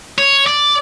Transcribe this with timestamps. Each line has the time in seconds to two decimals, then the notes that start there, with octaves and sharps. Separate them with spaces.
0.18 C#5
0.47 D5